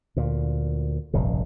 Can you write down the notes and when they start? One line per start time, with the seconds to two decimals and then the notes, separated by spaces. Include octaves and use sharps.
0.16 D2 A#2
1.14 F1 A#1 G2 C#3